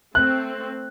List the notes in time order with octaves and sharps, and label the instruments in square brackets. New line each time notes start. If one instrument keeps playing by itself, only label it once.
[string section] A3 C4 [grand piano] F#6